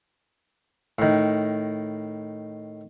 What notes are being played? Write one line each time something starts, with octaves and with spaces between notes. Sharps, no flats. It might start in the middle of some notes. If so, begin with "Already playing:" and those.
A2 D#3